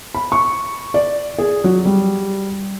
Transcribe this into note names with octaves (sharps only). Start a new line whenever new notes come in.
B5
C#6
D5
G#4
F#3
G3